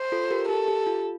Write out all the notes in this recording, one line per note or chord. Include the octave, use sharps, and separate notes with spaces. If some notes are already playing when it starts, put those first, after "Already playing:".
Already playing: C5
F4 A4
G4 A#4
G4 A4
G4
F4